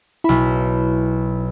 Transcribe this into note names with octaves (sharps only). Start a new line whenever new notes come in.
B1 E4 B5